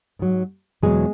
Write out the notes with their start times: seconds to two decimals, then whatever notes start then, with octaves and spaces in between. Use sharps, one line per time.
0.19 G#2 F#3
0.82 E2 B2 F#3 G#3 G#4